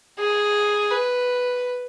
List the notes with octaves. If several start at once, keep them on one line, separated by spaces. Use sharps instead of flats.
G#4
B4